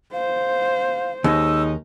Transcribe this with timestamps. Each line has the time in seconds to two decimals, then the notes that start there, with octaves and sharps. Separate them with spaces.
0.13 C5 F5
1.24 D#2 G#3 C#4 D#4 E6